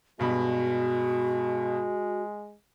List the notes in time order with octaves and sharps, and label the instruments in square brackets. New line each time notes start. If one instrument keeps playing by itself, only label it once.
[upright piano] G2 B2 B5 [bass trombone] G#3 [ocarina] F#4